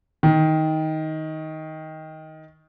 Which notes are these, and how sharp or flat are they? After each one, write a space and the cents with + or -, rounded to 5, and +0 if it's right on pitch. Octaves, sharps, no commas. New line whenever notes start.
D#3 +15